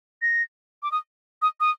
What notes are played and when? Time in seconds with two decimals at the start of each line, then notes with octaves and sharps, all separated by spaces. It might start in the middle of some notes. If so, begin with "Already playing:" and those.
0.22 A#6
0.83 D6
0.92 D#6
1.42 D#6
1.60 D#6